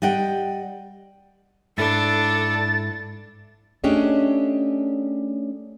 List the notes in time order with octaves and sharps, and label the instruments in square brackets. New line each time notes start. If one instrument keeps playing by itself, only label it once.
[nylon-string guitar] G3 D#5 F#5 G5
[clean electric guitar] G#2 E4 [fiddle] D4 [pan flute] A4 [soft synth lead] A6
[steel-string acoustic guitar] A3 C#4 D4 G4 G#4 D#5